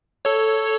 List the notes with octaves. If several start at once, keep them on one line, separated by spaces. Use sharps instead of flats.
A4 C#5